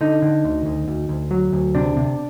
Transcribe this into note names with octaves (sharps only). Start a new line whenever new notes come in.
D3 D#4
D3
D2
D2
D2
D2
F#3
D2
C3 D4
C3